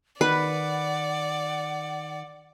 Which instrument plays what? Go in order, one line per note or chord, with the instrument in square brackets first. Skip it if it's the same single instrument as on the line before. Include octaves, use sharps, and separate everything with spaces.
[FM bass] D#3 [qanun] B4 [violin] D5 [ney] F#5